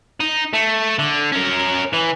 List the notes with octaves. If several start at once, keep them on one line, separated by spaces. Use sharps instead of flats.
D#4
A3
D3
C#4 A#4
E3